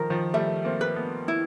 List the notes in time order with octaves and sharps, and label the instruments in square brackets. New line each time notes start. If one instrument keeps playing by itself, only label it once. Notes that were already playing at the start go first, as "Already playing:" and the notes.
Already playing: [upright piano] D#3 F3 [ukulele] A#4
[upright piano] D#3 F3
[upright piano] G3 A3 [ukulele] E5
[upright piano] A#3 C4
[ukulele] B4
[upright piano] A3 B3
[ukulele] E4